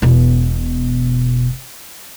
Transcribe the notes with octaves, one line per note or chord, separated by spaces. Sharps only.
E1 B2